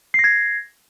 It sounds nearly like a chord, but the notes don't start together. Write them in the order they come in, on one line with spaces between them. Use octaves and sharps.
C7 A#6 G#6